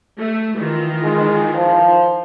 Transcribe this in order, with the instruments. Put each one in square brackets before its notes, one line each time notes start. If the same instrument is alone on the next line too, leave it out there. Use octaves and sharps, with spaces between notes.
[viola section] A3
D#3 E3 F4
[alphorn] G#3
F3